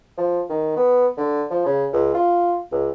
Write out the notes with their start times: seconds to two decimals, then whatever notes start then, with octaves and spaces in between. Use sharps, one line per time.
0.18 F3
0.50 D#3
0.76 B3
1.17 D3
1.50 F3
1.66 C#3
1.93 C#2
2.15 F4
2.72 C#2